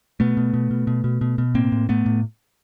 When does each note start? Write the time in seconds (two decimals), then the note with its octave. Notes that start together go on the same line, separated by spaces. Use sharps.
0.20 B2 A3 B3
0.37 B2
0.54 B2
0.71 B2
0.87 B2
1.04 B2
1.21 B2
1.38 B2
1.55 A2 A#3 C4
1.72 A2
1.89 A2 A3 B3
2.06 A2